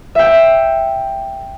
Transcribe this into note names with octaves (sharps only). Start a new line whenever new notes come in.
E5 G5